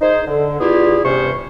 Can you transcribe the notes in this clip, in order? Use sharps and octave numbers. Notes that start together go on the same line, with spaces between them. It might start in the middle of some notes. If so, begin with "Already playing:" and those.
D#4 G#4 C5
D3
B3 D4 E4 F4 G4 G#4
E2 G2 C3 C#4 C5 C#6